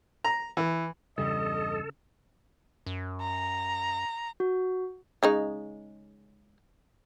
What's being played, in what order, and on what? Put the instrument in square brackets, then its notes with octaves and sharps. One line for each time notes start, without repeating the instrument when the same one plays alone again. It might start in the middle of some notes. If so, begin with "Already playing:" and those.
[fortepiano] A#5
E3
[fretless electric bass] E2 G2 G3 [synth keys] C#3 [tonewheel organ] A4 [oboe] D#5
[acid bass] F#2
[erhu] A#5
[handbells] F#4
[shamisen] C#3 G#3 D#4